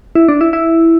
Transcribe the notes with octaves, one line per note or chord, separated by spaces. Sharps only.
E4
D4
E4
E4